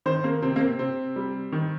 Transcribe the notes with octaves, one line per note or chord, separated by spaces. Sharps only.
D#3 C5
A#3
C3 C4
A#3
C4
C3 C4
G3
D#3